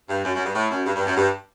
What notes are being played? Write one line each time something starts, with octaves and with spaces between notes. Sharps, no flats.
G2
F#2
F#2
G2
A2
F#2
G2
G2
F#2
G2